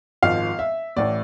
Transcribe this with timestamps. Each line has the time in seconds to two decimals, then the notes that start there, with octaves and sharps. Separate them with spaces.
0.22 G#1 G#2 F3 F5
0.59 E5
0.96 A1 A2 E3 D5